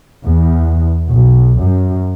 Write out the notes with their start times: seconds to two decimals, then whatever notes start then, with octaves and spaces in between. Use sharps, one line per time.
0.24 E2
1.12 B1
1.60 F#2